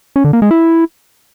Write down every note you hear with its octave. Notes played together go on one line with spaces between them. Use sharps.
C#4
D3
A#3
G#3
E4